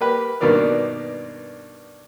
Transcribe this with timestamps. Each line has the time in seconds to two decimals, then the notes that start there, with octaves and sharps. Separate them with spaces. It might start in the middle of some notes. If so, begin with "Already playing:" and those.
0.01 A#3 G4 B4
0.41 G2 B2 D#3 A#3 D5 F6